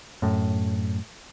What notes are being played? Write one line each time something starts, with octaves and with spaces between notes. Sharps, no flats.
F#2 A2